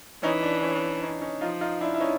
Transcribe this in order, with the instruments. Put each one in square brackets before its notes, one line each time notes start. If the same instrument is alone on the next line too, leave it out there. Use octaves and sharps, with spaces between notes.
[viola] E3 [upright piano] C#4 D#4
[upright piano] D4
C#4
C#4 D#4
C#4 D#4
[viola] F3 [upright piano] D#4 F4
[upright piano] D#4 F4
D4 E4
E4
C#4 D#4